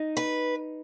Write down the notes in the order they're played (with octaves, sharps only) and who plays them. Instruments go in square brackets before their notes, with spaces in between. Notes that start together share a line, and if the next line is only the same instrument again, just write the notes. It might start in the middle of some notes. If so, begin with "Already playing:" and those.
Already playing: [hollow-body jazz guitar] D#4
[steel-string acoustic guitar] B4